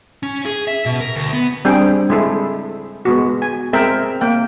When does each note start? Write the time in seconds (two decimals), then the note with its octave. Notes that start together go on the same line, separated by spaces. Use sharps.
0.23 C#4
0.46 G#4
0.68 E5
0.86 B2
1.00 A#4
1.16 D2
1.33 B3
1.65 G3 C4 D4 G#4 G5
2.10 G#3 E4 A4
3.05 G#3 B3 F#4
3.42 G#5
3.73 G#3 C4 A#4 E5 G5
4.21 A#3 G5